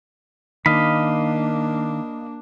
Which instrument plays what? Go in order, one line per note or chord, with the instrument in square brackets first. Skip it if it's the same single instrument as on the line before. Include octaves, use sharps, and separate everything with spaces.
[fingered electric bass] D#3 [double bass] A#3 D4 [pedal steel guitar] D#5 F5 B5